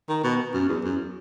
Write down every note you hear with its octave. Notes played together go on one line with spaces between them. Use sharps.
D#3
B2
F#2
E2
F#2